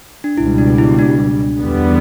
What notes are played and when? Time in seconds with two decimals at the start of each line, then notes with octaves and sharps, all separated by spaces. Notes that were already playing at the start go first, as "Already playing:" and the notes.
0.24 D4
0.37 C#2 B2 G3 E4
0.58 D4
0.78 E4
0.99 D4
1.60 E2 D3 G3 B3